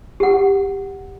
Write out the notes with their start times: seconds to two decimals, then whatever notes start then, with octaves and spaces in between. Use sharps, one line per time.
0.20 G4 F#5